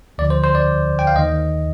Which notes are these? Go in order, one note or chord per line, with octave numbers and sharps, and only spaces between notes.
D2 D3 F3 D5
C5
C5
D5
G5
F5
D#2 D#3 D#5